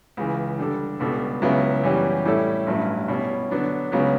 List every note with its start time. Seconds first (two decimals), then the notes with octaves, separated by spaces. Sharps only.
0.17 C#2 C#3 E3
0.59 D3 G3 D4 A4
1.00 C#2 B2 G3 D4 A4
1.42 C#2 C#3 F#3 B3 E4
1.83 F#2 E3 G3 C#4 G4
2.25 A2 G3 C#4 E4 A4
2.67 A1 G2 F#3 C#4 E4
3.08 B2 G3 C#4 E4
3.51 D3 F#3 B3 D4
3.92 C#2 C#3 F#3 B3